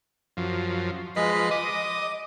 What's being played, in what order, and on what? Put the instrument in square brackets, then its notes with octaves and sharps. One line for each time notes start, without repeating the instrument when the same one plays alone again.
[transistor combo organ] F#2 F3
[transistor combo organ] F3 B4 [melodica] G#3 D#5
[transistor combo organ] D#5 [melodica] D6